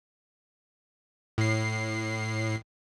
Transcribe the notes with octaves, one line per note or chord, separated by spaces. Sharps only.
A2 C7